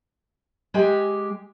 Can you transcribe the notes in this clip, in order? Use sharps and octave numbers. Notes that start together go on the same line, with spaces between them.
G#3 G4 G#5